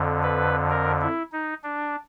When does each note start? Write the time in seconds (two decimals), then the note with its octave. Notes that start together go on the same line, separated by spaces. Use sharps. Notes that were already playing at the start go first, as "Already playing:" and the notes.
Already playing: F2 D3
0.23 B4
0.70 A#4
1.01 E4
1.32 D#4
1.64 D4